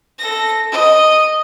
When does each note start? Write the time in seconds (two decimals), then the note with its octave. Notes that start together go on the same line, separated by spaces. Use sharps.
0.19 A4 A#6
0.72 D#5